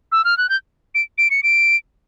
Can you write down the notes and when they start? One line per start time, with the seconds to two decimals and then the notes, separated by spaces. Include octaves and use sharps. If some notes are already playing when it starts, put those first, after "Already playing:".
0.12 E6
0.25 F6
0.38 F#6
0.49 G6
0.95 D7
1.18 D7
1.31 C#7
1.43 D7